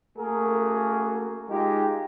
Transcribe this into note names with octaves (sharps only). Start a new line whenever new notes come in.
A3 A#3 C#4 F#4 G#4 A#4
G#3 D#4 F4 G4